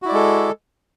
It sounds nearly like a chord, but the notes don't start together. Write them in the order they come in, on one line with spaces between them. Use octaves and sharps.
F#4 E4 D5 G#3 A4